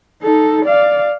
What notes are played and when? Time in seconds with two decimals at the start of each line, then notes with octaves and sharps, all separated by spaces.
0.22 D#4 A4
0.65 D5 F5